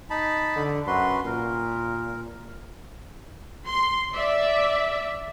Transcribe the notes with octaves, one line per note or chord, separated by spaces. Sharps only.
D#4 A5 B5
D3
F#2 F#4 B4 C6
A#2 A#4
C6
D5 E5